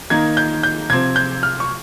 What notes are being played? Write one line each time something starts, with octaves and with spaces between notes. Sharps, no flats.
D#3 A#3 D#4 G#6
G6
G6
C3 F3 C4 G#6
G6
F6
C#6